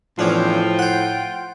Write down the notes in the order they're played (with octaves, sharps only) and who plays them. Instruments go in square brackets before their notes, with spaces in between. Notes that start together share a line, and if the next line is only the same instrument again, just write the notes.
[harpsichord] E2 C#4 D4 [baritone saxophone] A2 [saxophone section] F3 [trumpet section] F4 G5
[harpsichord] C5 F#5